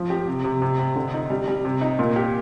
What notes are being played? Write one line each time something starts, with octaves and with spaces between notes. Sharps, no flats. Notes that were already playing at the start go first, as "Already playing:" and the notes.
Already playing: F3
G4
C3
C3
C3
C3
D3
D#4
G3
G3
C3
D#4
A#2
G4